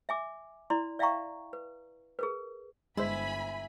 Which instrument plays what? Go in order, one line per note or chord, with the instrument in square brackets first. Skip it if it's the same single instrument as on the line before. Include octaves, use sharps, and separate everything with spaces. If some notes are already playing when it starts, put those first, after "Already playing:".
[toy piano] E5 G#5 D6
E4 D5 A#5 C6
D5 E5 F5 G5 A#5 C#6
B4
G#4 A#4 B4
[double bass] G1 [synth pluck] G#3 C5 [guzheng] E4 [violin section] G#5 B5